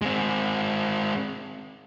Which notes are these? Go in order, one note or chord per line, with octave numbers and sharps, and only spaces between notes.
G#3 C4